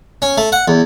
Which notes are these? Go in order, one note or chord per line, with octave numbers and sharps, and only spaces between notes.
C#4
A3
F#5
E2